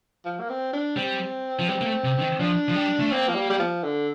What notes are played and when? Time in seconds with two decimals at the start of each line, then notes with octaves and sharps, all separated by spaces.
0.25 F3
0.40 A#3
0.49 C4
0.73 D4
0.96 G3 C4
1.59 F3
1.68 G3 C4
1.81 A#3
1.86 A3
2.04 C3
2.18 D3
2.21 D#3
2.40 F3 D4
2.69 F3
2.75 G3
3.00 A3
3.12 A#3 C4
3.28 F3
3.35 G3
3.50 G3
3.59 F3
3.83 D3